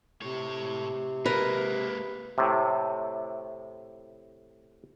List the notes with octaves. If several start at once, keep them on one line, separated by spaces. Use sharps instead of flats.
A2 C3 C#5
G#3 A#3 A#4 B4
A2 C3